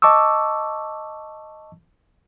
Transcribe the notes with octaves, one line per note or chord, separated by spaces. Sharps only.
D#5 A5 C#6 D6 E6